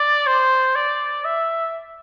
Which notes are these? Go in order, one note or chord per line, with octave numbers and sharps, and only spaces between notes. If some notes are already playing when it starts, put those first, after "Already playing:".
Already playing: D5
C5
D5
E5